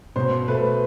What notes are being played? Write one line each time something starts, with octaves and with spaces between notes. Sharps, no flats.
B2 C5
A3 B4